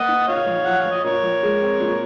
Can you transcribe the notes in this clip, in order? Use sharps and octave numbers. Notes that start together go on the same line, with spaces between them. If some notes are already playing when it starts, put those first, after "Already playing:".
Already playing: A#3 D#5 F#5
D#4
A#2 C#5 F5
A#1
F3 F#5
F5
A#1
D#5
A#2 A#4 C#5
A#1
G#3
C4
A#2